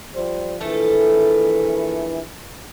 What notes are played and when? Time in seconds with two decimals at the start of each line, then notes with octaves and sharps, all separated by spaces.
0.14 F3 G3 C5
0.61 A#1 E3 F3 A3 A4